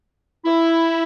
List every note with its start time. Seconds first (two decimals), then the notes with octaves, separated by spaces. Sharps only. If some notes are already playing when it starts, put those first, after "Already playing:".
0.45 E4